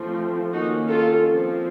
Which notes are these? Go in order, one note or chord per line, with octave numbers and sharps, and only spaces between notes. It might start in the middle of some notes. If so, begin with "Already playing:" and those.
Already playing: F3 A3 C4
D#3 A#3 C#4 D#4 F#4
F4 A4
F3 C4